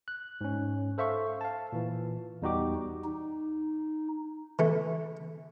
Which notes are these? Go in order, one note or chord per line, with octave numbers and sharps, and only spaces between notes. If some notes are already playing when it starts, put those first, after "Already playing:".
F#6
G#2 C#4
A4 C5 E5 F5 C#6
F5 A5
A#2 E3
E2 G3 D#4 F#4 G4 D6
D#4
E3 A3